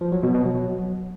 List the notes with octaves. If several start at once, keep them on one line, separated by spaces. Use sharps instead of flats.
F3
F#3
B2
B2
F#3